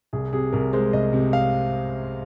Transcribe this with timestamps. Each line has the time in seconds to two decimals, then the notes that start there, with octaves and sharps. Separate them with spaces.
0.13 C2 G#4
0.33 C3 G#4
0.53 C2 A#4
0.73 G#3 C5
0.93 C2 D#5
1.13 C3
1.33 F5